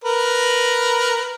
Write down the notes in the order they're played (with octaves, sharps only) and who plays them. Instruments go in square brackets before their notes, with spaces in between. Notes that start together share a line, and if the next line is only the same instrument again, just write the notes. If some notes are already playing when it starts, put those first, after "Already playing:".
[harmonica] A#4 B4